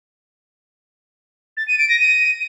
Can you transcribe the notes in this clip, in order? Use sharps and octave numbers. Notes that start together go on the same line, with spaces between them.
A6
D#7
D7
A#6
D#7